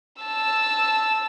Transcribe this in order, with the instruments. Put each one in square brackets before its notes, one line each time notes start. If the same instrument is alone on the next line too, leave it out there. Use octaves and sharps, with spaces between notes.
[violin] A5 E6